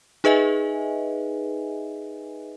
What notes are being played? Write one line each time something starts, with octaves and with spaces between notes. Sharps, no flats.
D#4 G#4 B4 D#5 E5 G#5